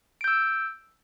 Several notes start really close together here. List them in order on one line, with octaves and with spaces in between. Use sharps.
D7 G6 E6